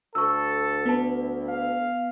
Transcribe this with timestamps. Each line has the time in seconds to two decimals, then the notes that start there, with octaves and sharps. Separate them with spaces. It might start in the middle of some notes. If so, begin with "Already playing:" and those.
0.15 D2 A4 C#6 E6
0.86 B3 B4 A5
1.49 F5